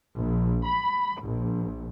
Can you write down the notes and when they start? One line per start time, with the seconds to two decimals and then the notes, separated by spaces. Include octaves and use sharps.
0.17 A#1
0.64 B5
1.21 A#1